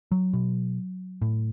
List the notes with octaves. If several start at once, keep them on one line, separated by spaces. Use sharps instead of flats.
F#3
B2
A2